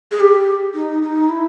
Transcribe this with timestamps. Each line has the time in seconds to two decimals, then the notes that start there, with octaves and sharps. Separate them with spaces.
0.12 G#4
0.20 G4
0.74 D#4
1.02 D#4
1.29 E4